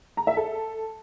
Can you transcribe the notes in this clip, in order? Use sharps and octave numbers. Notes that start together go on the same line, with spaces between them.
A#5
E5
A4